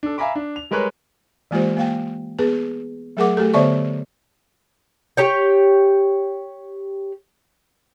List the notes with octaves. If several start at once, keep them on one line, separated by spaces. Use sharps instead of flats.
D4 A4
E5 F5 G#5 A#5 B5 D6
D4
F7
G3 G#3 A#4 B4 C#5 F#6
E3 G#3 A#3 F4 G4 C5
A#3 F5 G5
B3 G#4 B4
F#3 A3 G#4 A#4 F#5 D6
A3 G4 A4
D3 B3 C5 D5 E5 C#6
G4 C#5 G5